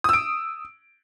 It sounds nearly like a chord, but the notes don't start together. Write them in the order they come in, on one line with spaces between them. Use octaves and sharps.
D#6 E6 D7